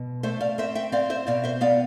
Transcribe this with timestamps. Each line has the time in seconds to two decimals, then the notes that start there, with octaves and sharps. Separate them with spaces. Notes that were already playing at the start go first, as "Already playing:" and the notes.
Already playing: B2
0.23 A3 C5 E5
0.41 D5 F5
0.58 C4 C5 E5
0.75 E5 G5
0.92 C4 D5 F5
1.10 C5 E5
1.27 B2 D5 F5
1.44 C5 E5
1.61 B3 D5 F5